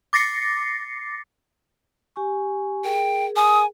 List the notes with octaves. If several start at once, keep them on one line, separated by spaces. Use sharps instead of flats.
D6 A6 A#6 C7 C#7
G4 G#5 C#6
G#4 A#4 G5
G#5 D#6